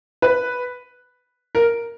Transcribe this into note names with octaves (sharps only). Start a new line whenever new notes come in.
B4
A#4